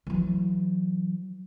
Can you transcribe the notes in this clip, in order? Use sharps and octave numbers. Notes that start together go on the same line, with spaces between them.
E3 F#3